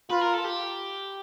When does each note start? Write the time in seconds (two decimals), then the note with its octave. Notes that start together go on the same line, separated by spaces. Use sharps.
0.10 F4 B4
0.21 A#4
0.34 A4
0.44 G4